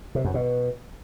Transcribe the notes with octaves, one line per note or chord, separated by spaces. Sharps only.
C3
F#2
B2